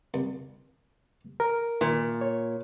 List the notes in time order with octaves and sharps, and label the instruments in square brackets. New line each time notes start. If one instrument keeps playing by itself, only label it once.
[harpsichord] C2
[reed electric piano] A#4
[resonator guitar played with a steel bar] A#2 [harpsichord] D#3
[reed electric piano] C#5